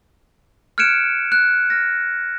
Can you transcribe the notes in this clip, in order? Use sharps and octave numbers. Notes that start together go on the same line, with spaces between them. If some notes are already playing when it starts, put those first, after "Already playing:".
F6 F#6 G#6 C#7 D7 E7
F#6
F6 A#6